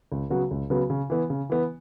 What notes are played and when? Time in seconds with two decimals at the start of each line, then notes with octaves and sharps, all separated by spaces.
0.12 C#2
0.30 C#3 F#3 B3 F#4
0.51 C#2
0.70 C#3 F#3 B3 F#4
0.90 C#3
1.10 E3 B3
1.30 C#3
1.50 E3 B3